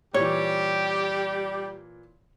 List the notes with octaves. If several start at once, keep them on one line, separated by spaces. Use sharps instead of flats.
A#2 E3 G3 G4 C#5